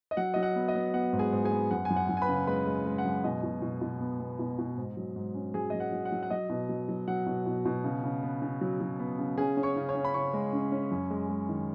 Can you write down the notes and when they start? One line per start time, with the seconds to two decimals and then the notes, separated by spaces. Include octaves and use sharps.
0.11 D#5
0.17 F#3 F#5
0.34 F#3 D#5
0.43 F#5
0.56 B3
0.68 D#5
0.75 B3
0.94 B3 F#5
1.13 G#2
1.19 G#4 G#5
1.32 G#2
1.45 G#4 G#5
1.52 B3
1.71 F#2 F#5
1.85 F#2 G#5
1.96 F#5
2.09 F#2
2.17 G#5
2.22 B4 B5
2.29 C#3
2.47 G#3 B4 B5
2.66 G#3
2.86 G#3
2.98 F#5
3.05 F#2
3.24 B2 D#5
3.43 B2
3.62 B2
3.81 B2
4.01 B3
4.20 B3
4.39 B2
4.59 B2
4.77 G#2
4.97 F#3
5.16 G#2
5.34 C#4
5.54 F#3 G#4 G#5
5.70 F#3 D#5
5.80 F#5
5.92 F#3
6.05 F#5
6.12 F#3
6.23 F#5
6.31 F#3 D#5
6.50 B2
6.69 F#3
6.89 F#3
7.08 F#3 F#5
7.27 B2
7.46 B2
7.66 B2
7.84 C#3
8.04 C#3
8.23 B3
8.42 C#3
8.61 F#3
8.81 F#3
8.99 B3
9.19 C#3
9.38 C#4 G#4 G#5
9.57 C#4
9.63 C#5 C#6
9.76 C#3
9.89 C#5 C#6
9.95 C#4
10.05 B5
10.14 C#3 C#5 C#6
10.33 G#3
10.53 C#4
10.72 C#4
10.91 F#2
11.11 G#3
11.29 G#3
11.49 D#3